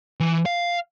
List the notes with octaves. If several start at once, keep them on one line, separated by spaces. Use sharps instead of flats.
E3
F5